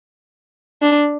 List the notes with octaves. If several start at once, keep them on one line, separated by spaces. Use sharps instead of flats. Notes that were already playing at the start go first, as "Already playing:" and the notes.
D4